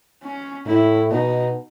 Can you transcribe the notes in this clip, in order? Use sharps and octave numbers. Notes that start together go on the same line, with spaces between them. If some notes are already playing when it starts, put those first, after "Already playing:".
C#4
A2 E4
B2 D#4